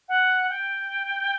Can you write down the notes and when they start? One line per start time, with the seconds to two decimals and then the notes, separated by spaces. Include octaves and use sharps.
0.08 F#5
0.49 G5